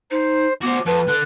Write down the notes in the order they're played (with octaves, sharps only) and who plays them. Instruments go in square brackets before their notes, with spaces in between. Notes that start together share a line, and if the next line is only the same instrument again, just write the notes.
[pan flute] D#4 [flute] C5
[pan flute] B3 [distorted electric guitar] F#4 C5 [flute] D6
[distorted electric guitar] F2 [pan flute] B4 [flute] A5
[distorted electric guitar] D3 [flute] F#6